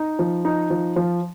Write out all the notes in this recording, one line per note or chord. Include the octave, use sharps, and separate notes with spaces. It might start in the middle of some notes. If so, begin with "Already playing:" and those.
Already playing: D#4
F3
D#4
F3
F3